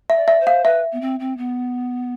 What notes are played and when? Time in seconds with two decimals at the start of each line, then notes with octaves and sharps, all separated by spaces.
0.10 E5
0.16 D5
0.28 E5
0.41 C5
0.47 F5
0.65 B4 E5
0.92 B3
1.01 C4
1.20 C4
1.38 B3